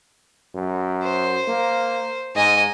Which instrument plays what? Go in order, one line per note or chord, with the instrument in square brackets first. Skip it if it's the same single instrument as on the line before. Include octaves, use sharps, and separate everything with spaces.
[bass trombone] F#2
[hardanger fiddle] C5
[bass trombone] A#3
[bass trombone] G#2 [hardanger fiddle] D#5 G#5